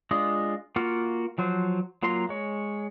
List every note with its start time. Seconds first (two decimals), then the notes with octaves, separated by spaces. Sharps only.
0.11 G#3 D4 F4 D#5
0.76 A#3 F4 F#4 F6
1.38 F3 F#3 C5
2.03 F#3 A#3 F4 A#5 C6
2.29 G#3 C#5